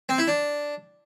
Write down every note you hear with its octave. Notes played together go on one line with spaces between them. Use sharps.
C4
E4
D4